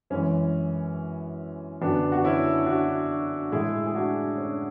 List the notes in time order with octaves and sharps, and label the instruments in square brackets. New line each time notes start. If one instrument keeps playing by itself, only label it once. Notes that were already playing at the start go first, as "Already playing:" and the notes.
[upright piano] F#2 E3 G#3 C#4
F#2 D3 F#3 B3 D4
F#4
C#4 E4
D4 F#4
A2 G#3 E4 G#4
G#4
D4 F#4
C#4